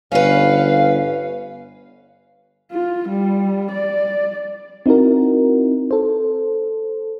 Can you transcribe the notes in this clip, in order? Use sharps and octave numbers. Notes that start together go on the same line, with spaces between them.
G1 C#4 B4 F5
F4
G3
D5
C4 D#4 E4 F#4 A#4
A4 C5